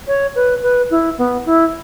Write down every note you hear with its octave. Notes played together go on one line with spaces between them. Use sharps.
C#5
B4
B4
E4
B3
E4